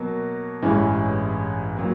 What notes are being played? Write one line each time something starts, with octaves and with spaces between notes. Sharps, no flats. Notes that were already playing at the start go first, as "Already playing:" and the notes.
Already playing: B2 F#3 A#3
A1 G2 E3 G#3 C#4
A#2 F#3